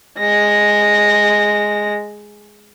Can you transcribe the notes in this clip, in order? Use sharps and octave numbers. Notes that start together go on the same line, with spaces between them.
G#3 A#6